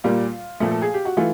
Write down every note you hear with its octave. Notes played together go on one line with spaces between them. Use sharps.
A#2 G3 A#3 F4
A#2 F3 A3
A4
G#4
G4
F#4
E3 A3 F4